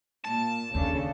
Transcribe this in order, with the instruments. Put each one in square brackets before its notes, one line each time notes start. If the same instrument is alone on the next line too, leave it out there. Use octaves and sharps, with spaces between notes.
[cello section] A#2 [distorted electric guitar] A5
[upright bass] D#2 [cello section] C#3 D4 A4